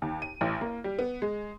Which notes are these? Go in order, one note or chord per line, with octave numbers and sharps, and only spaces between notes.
D#2
D#7
A1
A#3
G3
B3
G#3